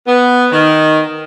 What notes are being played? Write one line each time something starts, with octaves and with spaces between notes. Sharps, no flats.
B3
D#3